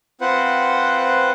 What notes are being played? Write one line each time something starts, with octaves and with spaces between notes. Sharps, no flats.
C4 F4 B4 C5 F#5